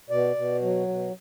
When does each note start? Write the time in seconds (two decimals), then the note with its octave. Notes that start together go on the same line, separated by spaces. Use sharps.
0.10 B2 D5
0.36 B2
0.62 F#3
0.88 B2